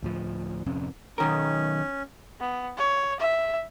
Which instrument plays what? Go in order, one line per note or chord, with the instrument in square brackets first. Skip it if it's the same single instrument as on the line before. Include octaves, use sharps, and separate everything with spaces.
[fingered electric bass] D2 A2 F3
D1 F2 C3 C#4
[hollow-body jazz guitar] B1 D#3 A#4 [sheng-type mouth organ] C#4
[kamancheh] B3
C#5
E5